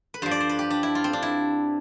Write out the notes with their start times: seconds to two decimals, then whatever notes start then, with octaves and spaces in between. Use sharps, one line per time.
0.14 B4
0.22 G2 F3 C5
0.31 D5
0.40 C5
0.49 B4
0.59 G4
0.70 D4
0.83 E4
0.95 F4
1.04 C4
1.13 D4
1.22 E4